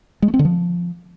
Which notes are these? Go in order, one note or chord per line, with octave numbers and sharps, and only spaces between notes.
G#3
A3
C4
D3
F3